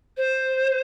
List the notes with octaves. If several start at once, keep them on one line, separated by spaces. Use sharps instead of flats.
C5